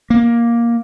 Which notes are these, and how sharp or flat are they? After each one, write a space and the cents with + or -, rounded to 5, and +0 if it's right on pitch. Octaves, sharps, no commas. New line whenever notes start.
A#3 +10